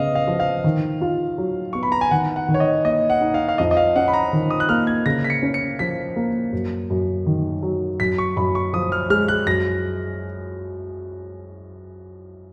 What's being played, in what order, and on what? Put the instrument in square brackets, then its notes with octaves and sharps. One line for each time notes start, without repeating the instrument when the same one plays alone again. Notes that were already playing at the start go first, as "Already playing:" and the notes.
Already playing: [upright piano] C#3 B3 [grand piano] D#5 F5
[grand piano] F5
[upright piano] F3
[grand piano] F5
[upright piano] D#3
F4
F#3
[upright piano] B3 [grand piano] C#6
[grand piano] B5
A#5
G#5
[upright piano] D#3 [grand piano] F#5
[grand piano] F#5
[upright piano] D#3
[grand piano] C#5
D#5
[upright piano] A#3 [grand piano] D#5
[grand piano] F#5
[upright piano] D#4
[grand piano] F5
F5
[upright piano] F2 [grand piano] D#5
[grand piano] D#5
F5
[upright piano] C#4 [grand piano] F#5
[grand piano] B5
A#5
[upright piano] D#3
[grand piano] D#6
F#6
[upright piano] A#3 [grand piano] F6
[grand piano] G#6
[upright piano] C#3 [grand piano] A#6
[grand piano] B6
C#7
[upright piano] C#4
[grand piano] C#7
[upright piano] F3 [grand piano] B6
[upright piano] A#3
F#2
F#2
D#3
F#3
[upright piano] F#2 [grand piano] B6
[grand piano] C#6
[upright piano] F#2 [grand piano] B5
[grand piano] C#6
[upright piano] F3 [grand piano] D#6
[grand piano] F6
[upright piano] G#3 [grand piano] F6
[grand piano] F#6
[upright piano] F#2 [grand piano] A#6